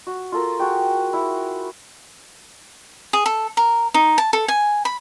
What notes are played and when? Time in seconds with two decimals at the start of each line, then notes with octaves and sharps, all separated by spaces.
0.07 F#4
0.32 F4 A4 A#4
0.59 F#4 G#4 G5
1.13 E4
3.13 G#4
3.26 A4
3.57 A#4
3.94 D#4
4.18 A5
4.33 A4
4.48 G#5
4.85 B5